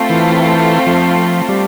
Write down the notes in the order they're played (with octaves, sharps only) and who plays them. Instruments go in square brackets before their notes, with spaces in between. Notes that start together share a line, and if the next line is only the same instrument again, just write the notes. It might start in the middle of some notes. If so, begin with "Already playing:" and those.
Already playing: [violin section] A3 C4 F4
[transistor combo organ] E3
F3
G3